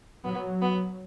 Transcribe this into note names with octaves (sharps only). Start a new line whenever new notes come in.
F#3 B3
B3